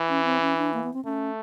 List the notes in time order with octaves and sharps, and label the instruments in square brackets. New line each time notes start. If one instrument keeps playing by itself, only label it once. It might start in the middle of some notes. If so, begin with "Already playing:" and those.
Already playing: [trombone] E3
[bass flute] C#4
C4
C#4
D4
A#3
B3
C4
[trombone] A3 [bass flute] C#4